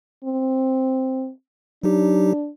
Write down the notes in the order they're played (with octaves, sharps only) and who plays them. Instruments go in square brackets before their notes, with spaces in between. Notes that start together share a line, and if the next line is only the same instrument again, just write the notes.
[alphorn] C4
[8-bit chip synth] F#3 D#4 G4 [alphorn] D4